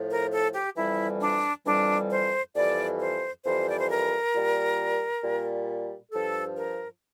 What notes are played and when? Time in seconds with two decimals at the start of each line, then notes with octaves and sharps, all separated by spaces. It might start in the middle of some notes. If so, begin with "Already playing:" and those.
Already playing: A2 F3
0.09 A#4
0.32 A4
0.53 G4
0.76 F2 E3 G3 E4
1.21 D4
1.65 F2 E3 G3 D4
2.10 C5
2.54 F2 E3 G3 D5
2.99 C5
3.44 F2 E3 G3 C5
3.69 D5
3.78 C5
3.89 A#4
4.33 A#2 G3
5.22 A#2 G3
6.12 G2 F3 A4
6.56 A#4